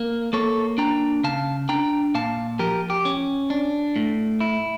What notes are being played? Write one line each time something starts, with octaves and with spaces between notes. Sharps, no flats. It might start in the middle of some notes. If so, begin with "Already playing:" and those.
Already playing: A#3
A#3 A4 C#5
D4 G5 A#5
C#3 F5 A5
D4 G5 A#5
A#2 F5 A5
F3 G4 A#4
G4
C#4
D4
A2
E4